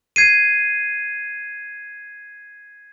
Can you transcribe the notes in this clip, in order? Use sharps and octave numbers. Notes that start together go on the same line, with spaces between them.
G#6 C7 D#7